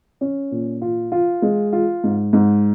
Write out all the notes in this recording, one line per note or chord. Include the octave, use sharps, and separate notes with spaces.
C#4
A#2
F4
F4
G#3
F4
G#2
G#2